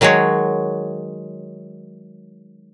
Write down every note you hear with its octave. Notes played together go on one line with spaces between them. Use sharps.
D#3 F#3 G#3 F#4 C#5